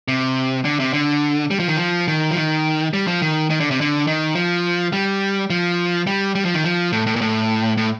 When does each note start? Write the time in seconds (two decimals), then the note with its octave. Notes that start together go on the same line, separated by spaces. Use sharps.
0.08 C3
0.65 D3
0.80 C3
0.93 D3
1.51 G3
1.60 F3
1.68 D#3
1.77 F3
2.08 D#3
2.31 F3
2.36 D#3
2.93 G3
3.07 F3
3.22 D#3
3.50 D#3
3.60 D3
3.71 C3
3.81 D3
4.07 D#3
4.35 F3
4.93 G3
5.50 F3
6.07 G3
6.35 G3
6.45 F3
6.54 D#3
6.64 F3
6.92 A2
7.07 A2
7.16 A#2
7.21 A2
7.77 A2